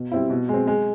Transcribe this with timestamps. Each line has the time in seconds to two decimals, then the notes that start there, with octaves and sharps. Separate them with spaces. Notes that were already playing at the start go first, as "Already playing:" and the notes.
Already playing: B2
0.12 G3 C4 E4
0.30 B2
0.49 G#3 C4
0.67 G#3